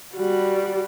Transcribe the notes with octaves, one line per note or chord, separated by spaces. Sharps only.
G3 F#4